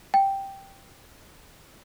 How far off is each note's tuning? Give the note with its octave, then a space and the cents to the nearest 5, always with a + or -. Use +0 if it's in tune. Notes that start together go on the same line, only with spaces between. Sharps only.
G5 +0